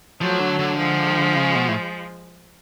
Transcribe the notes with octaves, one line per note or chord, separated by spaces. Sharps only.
F3 F#3 A3
D3
D3
F3 G#3
C#3
B2
A2